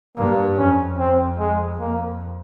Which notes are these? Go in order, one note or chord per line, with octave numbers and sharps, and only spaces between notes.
G2 A#3
F2 C#4
C4
G#3
F2 A#3